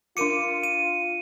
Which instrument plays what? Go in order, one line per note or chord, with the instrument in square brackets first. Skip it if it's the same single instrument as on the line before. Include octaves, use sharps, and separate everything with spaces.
[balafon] D4 A#4 D6 [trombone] F4 [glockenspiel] C#7 D#7
[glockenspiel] D#7